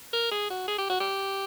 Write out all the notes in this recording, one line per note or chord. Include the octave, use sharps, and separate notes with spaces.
A#4
G#4
F#4
G#4
G4
F#4
G4